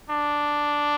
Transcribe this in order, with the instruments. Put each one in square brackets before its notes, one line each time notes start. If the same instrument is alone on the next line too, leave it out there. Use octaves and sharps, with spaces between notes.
[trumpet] D4